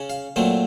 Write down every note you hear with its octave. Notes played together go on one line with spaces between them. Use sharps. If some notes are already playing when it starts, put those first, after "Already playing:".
Already playing: C#3 C#4
F5
A#2 F#3 A3 C4